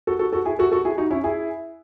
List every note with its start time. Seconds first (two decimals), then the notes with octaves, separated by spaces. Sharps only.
0.07 F#4 A4
0.19 F#4 A4
0.32 F#4 A4
0.45 E4 G#4
0.59 F#4 A4
0.72 F#4 A4
0.85 E4 G#4
0.98 D#4 F#4
1.11 C#4 E4
1.24 E4 G#4